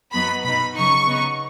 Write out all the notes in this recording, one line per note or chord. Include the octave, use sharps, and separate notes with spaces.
F#2 F#3 B3 D#4 B5
B2 B3 D#4 B5
C#3 F#3 D#4 C#6
C#3 B3 D#4